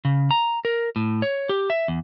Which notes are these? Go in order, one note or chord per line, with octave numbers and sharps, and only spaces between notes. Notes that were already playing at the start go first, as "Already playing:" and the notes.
C#3
A#5
A#4
A2
C#5
G4
E5
E2